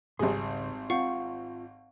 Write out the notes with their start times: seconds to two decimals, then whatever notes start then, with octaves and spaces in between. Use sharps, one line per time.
0.19 G#1 C#2 G#2 G3 G#4 C6
0.90 C4 F4 F5 F#5 C#6